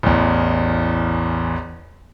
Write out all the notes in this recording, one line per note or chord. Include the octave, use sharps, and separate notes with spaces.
A1 E2